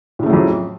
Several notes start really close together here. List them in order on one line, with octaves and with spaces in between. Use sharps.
A2 C#3 A3 F#3 F2